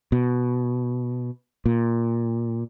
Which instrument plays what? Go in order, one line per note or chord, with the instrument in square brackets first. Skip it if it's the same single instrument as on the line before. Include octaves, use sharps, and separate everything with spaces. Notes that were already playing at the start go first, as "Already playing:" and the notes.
[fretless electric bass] B2
A#2